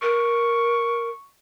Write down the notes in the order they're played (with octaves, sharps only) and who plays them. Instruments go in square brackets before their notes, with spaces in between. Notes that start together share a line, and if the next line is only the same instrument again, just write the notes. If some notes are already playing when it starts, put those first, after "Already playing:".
[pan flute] A#4 [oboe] C#6